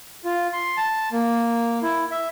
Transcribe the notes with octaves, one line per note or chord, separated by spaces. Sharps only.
F4
C6
A5
A#3
E4
E5